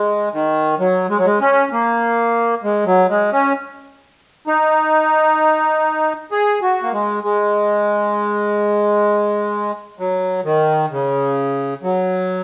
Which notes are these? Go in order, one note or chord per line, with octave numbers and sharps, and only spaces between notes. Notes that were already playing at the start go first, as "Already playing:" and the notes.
Already playing: G#3
D#3
F#3
G#3
F#3
G#3
C#4
A#3
G#3
F#3
G#3
C#4
D#4
G#4
F#4
A#3
G#3
G#3
F#3
D#3
C#3
F#3